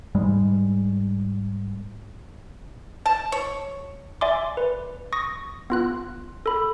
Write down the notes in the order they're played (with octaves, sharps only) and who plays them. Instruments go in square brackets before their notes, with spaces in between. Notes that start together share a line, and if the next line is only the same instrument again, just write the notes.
[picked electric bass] G#2 G3 G#3
[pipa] A5
C#5
[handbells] D5 E5 G#5 C6 D6
B4
C#6 D#6 A#6
B3 F4 F#6
A4 B5